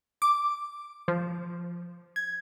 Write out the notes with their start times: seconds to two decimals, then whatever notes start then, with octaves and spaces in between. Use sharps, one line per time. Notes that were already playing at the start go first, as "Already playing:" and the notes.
0.22 D6
1.08 F3
2.16 G#6